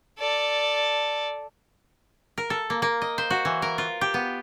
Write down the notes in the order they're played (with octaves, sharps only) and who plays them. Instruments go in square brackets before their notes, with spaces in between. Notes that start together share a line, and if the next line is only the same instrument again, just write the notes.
[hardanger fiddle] A4 D5
[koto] A#4
A4
A#3
A#3
D#5
C5
F#4
E3
A#4
F4
G4
B3